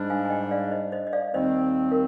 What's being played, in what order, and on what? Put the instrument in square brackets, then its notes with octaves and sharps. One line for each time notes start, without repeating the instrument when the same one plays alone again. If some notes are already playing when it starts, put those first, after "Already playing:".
Already playing: [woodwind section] G#2 G3 D4
[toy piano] F5 G#5
G#5
D#5 G5
D5 F5
C5 D#5
C5 D#5
D#5
D5 F5
[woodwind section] D#2 D#3 G3 C4 [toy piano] C5 D#5
[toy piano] A#4